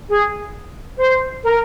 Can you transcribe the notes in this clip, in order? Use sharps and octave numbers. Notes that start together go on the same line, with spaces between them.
G#4
C5
A#4